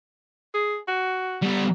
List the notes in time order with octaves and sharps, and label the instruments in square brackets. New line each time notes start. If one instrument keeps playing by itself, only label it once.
[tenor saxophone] G#4
F#4
[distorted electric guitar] G3 B3